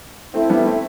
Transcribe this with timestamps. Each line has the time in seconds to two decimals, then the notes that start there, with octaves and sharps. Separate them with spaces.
0.34 A3 C4 E4 A4 C5 E5
0.50 G3 B3
0.66 A3 C4